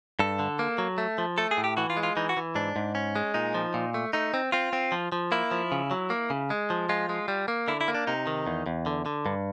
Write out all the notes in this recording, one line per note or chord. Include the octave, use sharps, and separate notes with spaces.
G2 A4
D3
A#3
F#3
A3
F3
A3 A4
G#4
A2
G4
E3 F#4
F4
G#3
F4
E3 D#4
F#4
E3
G#2 D4
G#2
C#4
G#3
A#2 D#4
F3
A#2
A3
A3 D#4
C4
C4 F4
C4
F3
F3
A#3 E4
F3
C#3
F#3
A#3
C#3
G#3
F3
G#3 F4
G#3
G3
A#3
D3 E4
E4
A#3
D4
C3 D#4
D#3
E2
E2
D3
D3
G2